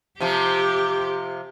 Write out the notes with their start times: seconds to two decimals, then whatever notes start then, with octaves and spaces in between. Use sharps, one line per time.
0.20 C3 F3 G4